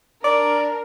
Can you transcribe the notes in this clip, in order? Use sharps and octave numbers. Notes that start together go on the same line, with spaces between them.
D4 A#4 D5